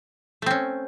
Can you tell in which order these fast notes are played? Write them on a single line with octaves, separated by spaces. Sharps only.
A3 C4 C#4